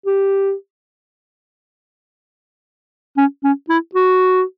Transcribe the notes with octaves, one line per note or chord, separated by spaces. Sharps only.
G4
C#4
C#4
E4
F#4